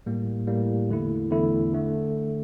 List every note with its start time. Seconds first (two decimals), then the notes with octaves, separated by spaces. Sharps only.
0.06 A2 G3 A#3
0.47 A2 G3 A#3
0.89 E2 D3 A3 E4
1.31 E2 D3 A3 E4
1.73 D3 A3